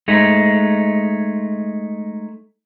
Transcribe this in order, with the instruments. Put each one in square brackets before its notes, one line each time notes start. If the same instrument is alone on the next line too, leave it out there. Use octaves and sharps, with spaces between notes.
[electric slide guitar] G#3 A3 D#4